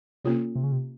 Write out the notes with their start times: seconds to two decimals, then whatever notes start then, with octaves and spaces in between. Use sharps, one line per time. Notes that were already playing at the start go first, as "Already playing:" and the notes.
0.24 C3 A#3 C#4 F4 A4 C#5
0.55 C3
0.64 C#3
0.72 C3